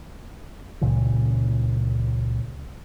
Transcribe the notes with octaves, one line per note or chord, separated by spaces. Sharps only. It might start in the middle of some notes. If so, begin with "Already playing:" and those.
C#2 A#2 C#3 E3